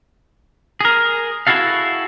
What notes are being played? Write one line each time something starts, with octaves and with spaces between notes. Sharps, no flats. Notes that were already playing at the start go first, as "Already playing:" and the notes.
G#4 A#4
E4 F#4 G#4 A4 F5